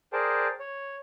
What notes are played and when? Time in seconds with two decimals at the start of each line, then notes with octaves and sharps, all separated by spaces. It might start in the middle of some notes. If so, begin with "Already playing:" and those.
0.13 G#4 A#4 C5 D5 G5 A5
0.60 C#5